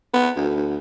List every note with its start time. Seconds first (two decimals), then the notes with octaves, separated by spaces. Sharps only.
0.13 B3
0.36 D2